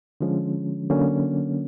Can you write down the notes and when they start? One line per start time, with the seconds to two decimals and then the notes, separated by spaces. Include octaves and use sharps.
0.21 D3 F3 G#3 C#4
0.90 D3 F#3 A#3 C#4